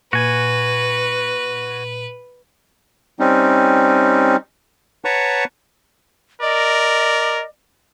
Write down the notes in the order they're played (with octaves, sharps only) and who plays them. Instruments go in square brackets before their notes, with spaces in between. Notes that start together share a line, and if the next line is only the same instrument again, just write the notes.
[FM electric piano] A#2 [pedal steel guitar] F#4 G#5 [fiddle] B4
[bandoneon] G3 C4 C#4 D#4
B4 C#5 F#5 A5 A#5 C#6
[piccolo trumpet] A#4 [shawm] D5 [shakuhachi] D#5